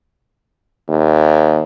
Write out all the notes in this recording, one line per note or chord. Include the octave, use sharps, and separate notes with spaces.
D#2